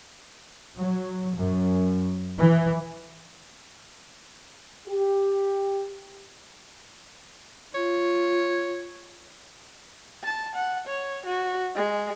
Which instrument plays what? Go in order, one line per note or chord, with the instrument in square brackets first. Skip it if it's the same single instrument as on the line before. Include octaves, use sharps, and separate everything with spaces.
[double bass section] F#3
F#2
E3
[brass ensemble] G4
[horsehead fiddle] F4 [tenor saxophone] C#5
[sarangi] A5
F#5
C#5
F#4
G#3